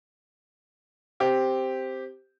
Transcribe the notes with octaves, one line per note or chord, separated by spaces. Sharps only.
C4 G4